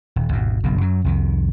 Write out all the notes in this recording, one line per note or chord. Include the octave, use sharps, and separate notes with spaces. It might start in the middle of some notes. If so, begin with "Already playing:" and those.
D#1
G#1 D#2 B2
F#1 B1 G2 B2
F#2 F#3
C2 F2 D#3